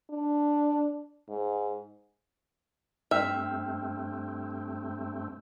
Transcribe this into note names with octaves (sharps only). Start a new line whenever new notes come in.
D4
G#2
G2 A3 C4 E5 G5 E6 F6